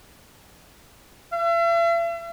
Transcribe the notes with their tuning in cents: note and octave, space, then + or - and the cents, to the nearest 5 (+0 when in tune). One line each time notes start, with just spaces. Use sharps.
E5 +40